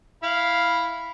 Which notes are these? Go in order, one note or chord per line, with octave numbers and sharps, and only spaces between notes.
E4 F5 B5